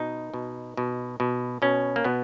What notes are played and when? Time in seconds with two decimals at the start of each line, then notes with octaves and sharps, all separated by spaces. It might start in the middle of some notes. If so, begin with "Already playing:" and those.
Already playing: B2 D#4
0.34 B2
0.77 B2
1.20 B2
1.62 B2 C#4
1.96 A#3
2.04 B2 B3